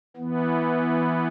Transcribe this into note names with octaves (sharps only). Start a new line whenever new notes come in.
E3 B3